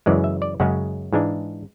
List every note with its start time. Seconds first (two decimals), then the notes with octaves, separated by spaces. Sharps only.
0.06 F#2 C#3 E3 G#3 D5
0.24 E5
0.42 D5
0.60 F#2 C#3 G#3 C#4 F#5
1.13 G#2 E3 G#3 D4